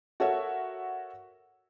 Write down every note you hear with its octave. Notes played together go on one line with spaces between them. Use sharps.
F#4 A4 A#4 C#5 E5